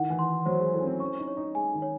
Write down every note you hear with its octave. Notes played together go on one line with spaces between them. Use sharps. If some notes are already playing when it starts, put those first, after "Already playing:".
Already playing: D#3 E4 F#5
E3
C6
F#3 C5
G#3
A3 E4
C#4
C4
C#4 C#6
D#4
C#5
D#4
G#3 G#5
D#3
C#5